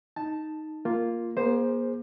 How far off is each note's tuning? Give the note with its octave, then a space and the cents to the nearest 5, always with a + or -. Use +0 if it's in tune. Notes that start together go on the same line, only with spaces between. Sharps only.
D#4 +0 A5 +0
A#3 +0 F4 +0
A#3 +40 G#4 +0 C5 +0